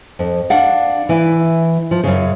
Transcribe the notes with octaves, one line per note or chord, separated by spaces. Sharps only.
F2
D4 F5 F#5
E3 E4
F3
F#2 C#3